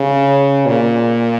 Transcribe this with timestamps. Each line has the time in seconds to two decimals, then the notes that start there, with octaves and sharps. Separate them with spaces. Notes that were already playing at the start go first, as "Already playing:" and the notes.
Already playing: C#3
0.66 A#2